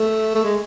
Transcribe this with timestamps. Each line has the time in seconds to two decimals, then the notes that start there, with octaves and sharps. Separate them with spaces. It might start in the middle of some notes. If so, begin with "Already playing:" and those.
Already playing: A3
0.35 A3
0.45 G#3